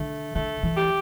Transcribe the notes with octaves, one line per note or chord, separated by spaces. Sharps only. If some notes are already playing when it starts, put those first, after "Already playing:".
Already playing: D3 A3
D3 A3
E3
G4